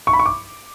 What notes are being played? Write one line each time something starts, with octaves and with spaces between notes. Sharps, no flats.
C#6
B5
C#6
D6